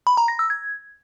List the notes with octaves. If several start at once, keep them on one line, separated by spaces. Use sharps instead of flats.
B5
A#5
A#6
E6
G#6